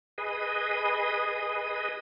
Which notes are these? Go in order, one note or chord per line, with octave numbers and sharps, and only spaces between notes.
G#4 B4 D#5